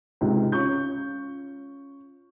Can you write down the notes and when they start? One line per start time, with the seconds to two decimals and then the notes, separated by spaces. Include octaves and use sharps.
0.21 C#2 G#2 C3
0.52 C#4 F4 C#6 G6